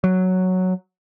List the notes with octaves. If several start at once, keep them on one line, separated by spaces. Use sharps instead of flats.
F#3